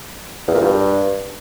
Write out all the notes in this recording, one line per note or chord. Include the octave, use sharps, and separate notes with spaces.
E2
A#2
G2